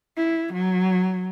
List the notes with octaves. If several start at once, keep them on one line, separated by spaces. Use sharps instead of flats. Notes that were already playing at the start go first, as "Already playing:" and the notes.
E4
F#3